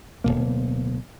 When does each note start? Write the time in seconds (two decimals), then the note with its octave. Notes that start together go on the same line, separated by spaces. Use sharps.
0.24 D1 D#2 B2 A#3